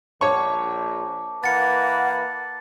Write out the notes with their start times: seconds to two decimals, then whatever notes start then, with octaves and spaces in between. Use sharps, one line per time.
0.21 A#1 C#5 A5 C#6 D6
1.44 E3 A#3 B4 F#5 A6 C#7